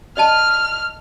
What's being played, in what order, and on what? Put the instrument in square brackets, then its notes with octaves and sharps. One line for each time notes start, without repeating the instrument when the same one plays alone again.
[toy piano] D5 D#5 A5 [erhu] F6